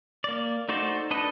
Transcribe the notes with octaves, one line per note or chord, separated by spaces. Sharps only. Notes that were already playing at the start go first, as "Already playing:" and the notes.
A#3 D5
A3 D#4 F#4 C5 D5
D4 D#4 A4 B4 D#5